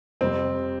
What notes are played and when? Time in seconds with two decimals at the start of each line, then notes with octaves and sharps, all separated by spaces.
0.21 F2 C3 G3 C4